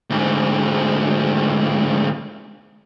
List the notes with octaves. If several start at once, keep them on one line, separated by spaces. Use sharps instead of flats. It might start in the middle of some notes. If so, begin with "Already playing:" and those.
D2 G#2